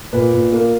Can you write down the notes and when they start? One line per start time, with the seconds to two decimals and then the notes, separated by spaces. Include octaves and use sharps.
0.13 A#2 B4
0.33 A#2
0.52 A#3